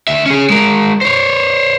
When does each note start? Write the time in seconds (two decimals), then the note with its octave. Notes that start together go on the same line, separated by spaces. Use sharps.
0.08 D2 E5
0.26 C#4 G#4
0.50 G#3 A#4
1.01 C5 C#5